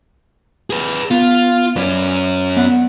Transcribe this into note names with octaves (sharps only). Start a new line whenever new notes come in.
G#4 B4
B3 F4
F#2 C#4 B4 D5
B3 D5 F#5